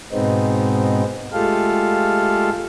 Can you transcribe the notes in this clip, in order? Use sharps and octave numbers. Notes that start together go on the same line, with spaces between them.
G#2 B2 G#3 B3 C4 D#4
G#3 A3 F4 G4 A4 F5